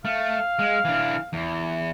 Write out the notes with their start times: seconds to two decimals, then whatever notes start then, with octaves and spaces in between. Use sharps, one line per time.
0.05 A3 F5
0.59 G#3
0.85 E3 D4
1.33 E2